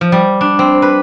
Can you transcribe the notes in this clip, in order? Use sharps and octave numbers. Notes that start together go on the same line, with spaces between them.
F3
G3
D4
C4
B4